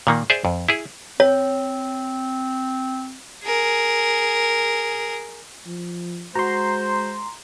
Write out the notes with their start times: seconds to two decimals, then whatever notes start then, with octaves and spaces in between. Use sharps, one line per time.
0.07 A#2 D#3 A#3
0.30 G#4 C5 D5 E5
0.45 F2
0.69 E4 G#4
1.20 C4 C#5
3.44 G#4 A#4
5.67 F3
6.35 G#3 F#4 C5 A#5 C6